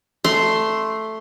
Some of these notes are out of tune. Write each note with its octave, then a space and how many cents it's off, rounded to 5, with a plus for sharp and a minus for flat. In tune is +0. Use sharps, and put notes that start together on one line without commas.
A3 +0 C6 +0